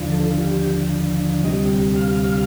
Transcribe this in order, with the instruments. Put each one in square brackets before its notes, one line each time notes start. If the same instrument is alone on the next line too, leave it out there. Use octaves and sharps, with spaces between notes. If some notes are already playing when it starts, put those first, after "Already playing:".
Already playing: [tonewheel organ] D#2 D3 F3
A4
F4
G4
D2 C3 G3 D#5
G5
F5